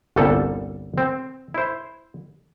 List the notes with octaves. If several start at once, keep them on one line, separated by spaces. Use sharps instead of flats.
G1 C2 A#2 G3 A4
C4
E4 C5